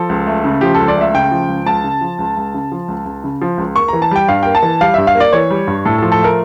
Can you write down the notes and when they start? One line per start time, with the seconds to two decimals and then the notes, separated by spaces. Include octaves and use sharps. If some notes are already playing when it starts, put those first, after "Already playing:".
Already playing: F3 A4
0.09 C#2
0.27 A3
0.44 C#3
0.61 F3 G4
0.75 A4
0.80 C#2
0.88 D5
0.97 A3 E5
1.14 C#3 G5
1.31 F3
1.48 C#2
1.66 C#2 A5
1.84 C#3
2.01 F3
2.19 C#2
2.37 C#2
2.54 C#3
2.72 F3
2.88 C#2
3.05 C#2
3.24 C#3
3.41 F3
3.58 C#2
3.76 A#3 C#6
3.88 E3 A#5
4.02 A5
4.11 G3 G5
4.28 G2 F5
4.43 A#3 G5
4.55 A5
4.62 E3
4.81 G3 F5
4.94 G2 E5
5.07 F5
5.15 A#3
5.20 D5
5.33 E3 C#5
5.50 G3
5.67 G2
5.86 A2 A4
5.98 F3 A4
6.12 A4
6.20 A3 A#4